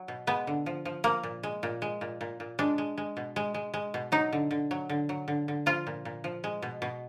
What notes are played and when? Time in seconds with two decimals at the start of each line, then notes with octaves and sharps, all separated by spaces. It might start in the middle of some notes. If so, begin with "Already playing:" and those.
Already playing: F#3
0.08 B2
0.27 G#3 B3
0.47 D3
0.66 F3
0.85 F3
1.04 F3 A#3
1.23 A#2
1.43 G#3
1.63 A#2
1.82 G#3
2.01 A#2
2.21 A#2
2.40 A#2
2.59 G#3 D4
2.78 G#3
2.98 G#3
3.17 B2
3.36 G#3
3.54 G#3
3.74 G#3
3.94 B2
4.12 F#3 D#4
4.33 D3
4.51 D3
4.71 F#3
4.89 D3
5.09 F#3
5.28 D3
5.48 D3
5.66 F3 F4
5.87 A#2
6.05 A#2
6.24 F3
6.44 G#3
6.62 B2
6.82 B2